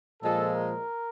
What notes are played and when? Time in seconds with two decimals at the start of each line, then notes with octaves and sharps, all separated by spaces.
0.22 A#2 F3 G#3 A4
0.53 A#4